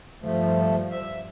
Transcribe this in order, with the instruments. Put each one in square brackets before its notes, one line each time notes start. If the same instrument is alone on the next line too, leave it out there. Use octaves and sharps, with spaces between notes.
[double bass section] G2 F3 [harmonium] A3
[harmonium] E5